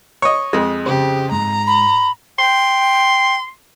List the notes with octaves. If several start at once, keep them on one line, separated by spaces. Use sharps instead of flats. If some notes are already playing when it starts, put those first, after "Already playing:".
C#5 D#5
F2 G#3
C#3 G4 C5
G#2 A#5
B5
G5 C6